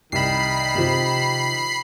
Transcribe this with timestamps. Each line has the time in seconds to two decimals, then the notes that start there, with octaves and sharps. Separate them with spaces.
0.12 C2 D#3 B5 C7
0.75 C3 F3